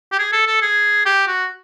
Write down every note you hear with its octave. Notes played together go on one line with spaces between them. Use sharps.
G4
G#4
A4
A4
G#4
G4
F#4